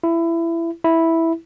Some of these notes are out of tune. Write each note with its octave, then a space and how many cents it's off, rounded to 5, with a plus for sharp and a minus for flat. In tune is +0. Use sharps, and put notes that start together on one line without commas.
E4 +20
E4 -5